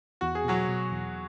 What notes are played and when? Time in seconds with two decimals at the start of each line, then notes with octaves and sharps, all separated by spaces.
0.21 E2 F#4
0.35 G#4
0.44 B2 F#3 F#4
0.68 B2
0.91 E2